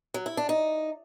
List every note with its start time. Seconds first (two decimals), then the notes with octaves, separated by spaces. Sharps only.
0.14 F#3
0.26 E4
0.37 D4
0.49 D#4